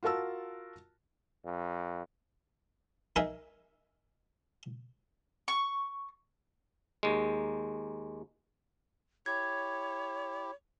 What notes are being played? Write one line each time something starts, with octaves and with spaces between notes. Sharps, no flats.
F4 F#4 A#4 A5 E6
F2
D#4 G#4 A#4 E5
C#6
D#2 G#3
E4 G4 C#5 G#6